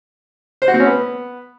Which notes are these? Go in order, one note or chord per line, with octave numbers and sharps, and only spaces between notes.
C5
F#4
C4
C#4
B3